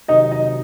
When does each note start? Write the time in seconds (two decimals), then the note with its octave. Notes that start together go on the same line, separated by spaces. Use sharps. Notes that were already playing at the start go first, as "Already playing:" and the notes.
0.08 C3 D#3 F#3 D#4 D#5
0.32 D#4 D#5